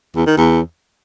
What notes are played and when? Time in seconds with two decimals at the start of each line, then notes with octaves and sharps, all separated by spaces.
0.16 E2
0.26 D#3
0.37 E2